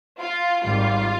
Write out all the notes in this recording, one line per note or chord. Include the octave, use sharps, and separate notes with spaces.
F4
G#1 G#2 G3 F4